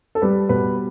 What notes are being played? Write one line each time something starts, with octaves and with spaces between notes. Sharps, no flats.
A4
G3 B4
B2 B4